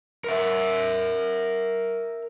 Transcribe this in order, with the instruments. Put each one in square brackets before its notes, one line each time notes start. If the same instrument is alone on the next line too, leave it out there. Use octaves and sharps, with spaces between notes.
[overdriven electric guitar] A#4 E5